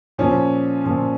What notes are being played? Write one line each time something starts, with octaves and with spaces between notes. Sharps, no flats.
A#2 F3 C#4
A#2 F3